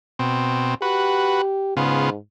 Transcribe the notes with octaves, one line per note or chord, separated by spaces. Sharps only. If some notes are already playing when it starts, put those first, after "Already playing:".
B2 C4
F#4 G4 B4
G#2 C#3 B3 F4